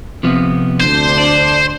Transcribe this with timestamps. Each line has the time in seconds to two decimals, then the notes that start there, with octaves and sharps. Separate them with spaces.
0.23 C3 F3 B3
0.80 D2 D4 C5
1.18 D5